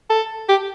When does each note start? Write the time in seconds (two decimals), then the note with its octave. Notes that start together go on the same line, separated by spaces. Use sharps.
0.10 A4
0.49 G4